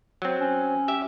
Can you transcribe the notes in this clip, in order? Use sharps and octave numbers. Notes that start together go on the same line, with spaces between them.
F#3 C4
C#4
G4 E5